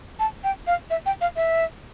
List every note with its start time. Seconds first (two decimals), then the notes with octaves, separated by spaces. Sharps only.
0.19 A5
0.44 G5
0.67 F5
0.90 E5
1.06 G5
1.21 F5
1.36 E5